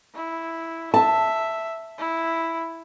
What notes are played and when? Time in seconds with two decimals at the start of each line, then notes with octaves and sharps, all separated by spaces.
0.14 E4
0.94 E5 A5
1.98 E4